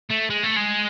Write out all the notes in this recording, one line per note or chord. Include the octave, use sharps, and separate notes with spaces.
A3
G#3
A3
G#3